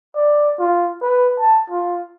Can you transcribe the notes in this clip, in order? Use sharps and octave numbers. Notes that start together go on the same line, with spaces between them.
D5
F4
B4
A5
F4